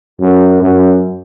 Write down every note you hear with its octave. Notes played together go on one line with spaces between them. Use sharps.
F#2
F#2